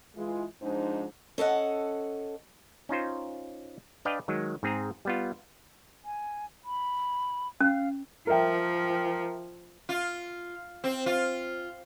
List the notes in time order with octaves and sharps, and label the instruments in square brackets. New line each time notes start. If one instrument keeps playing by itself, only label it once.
[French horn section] E3 G#3 F4
G#2 F3 G#3 D4 D#4 C5
[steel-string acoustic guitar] C#4 A4 D#5 F#5
[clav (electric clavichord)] C#4 D#4 F4 C5
D4 B4 D5 D#5 F5 G5
D#3 F#3 G#3
G#2 C4 G#4 A#5
G3 B3 F4
[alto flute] G#5
B5
[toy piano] C#4 [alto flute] F5
[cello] F3 [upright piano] A#4 E5 G5
[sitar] F4
C4
F4